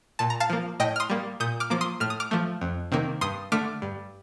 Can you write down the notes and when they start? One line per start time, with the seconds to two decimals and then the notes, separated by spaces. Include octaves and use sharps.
0.19 A#2 A5
0.30 A#5
0.40 F5 A5
0.50 F3 A#3
0.80 A2 D#5 G5
0.96 F6
1.00 C6 D#6
1.10 G3 A#3
1.40 A#2 D#6 G6
1.60 D6 F6
1.70 F3 A#3 D6
1.81 C6 D#6
2.00 A2 F6
2.10 D#6
2.20 D6 F6
2.31 F3 A3
2.61 F2
2.92 C3 D#3 A#3
3.21 G2 C6 D#6
3.52 D3 A3 D6 F6
3.82 G2